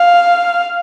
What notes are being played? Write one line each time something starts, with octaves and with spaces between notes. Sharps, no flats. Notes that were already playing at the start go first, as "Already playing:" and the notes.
Already playing: F5